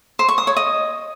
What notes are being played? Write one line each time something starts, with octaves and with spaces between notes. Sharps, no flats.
C5
C#6
D#6
C#5
D#5